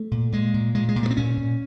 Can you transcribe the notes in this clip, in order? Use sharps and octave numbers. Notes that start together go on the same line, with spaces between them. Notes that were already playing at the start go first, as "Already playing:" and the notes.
Already playing: A3
A#2
A#2 G#3
A#2
A#2 G#3
G#3
A#2
A3
C4
A#2 C#4
A#2